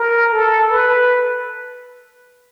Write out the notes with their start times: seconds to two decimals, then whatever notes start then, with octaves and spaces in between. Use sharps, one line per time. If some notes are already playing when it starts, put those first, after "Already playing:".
Already playing: A#4
0.32 A4
0.71 B4